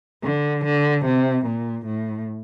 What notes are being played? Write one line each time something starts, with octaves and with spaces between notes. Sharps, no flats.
D3
D3
C3
A#2
A2